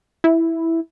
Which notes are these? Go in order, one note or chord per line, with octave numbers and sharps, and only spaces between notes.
E4